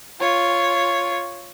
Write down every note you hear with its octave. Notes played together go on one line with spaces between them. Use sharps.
F4 C#5